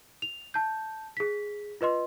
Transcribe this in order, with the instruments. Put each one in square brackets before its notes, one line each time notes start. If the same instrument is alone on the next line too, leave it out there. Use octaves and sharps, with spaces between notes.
[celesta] F7
A5 G6
G#4 B6
F4 B4 D#5 C6